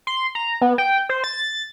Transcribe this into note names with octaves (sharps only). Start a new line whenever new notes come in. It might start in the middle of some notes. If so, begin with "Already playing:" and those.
C6
A#5
B3
G5
C5
A6